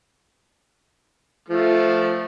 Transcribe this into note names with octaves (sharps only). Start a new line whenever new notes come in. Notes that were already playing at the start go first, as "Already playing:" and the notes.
F3 A3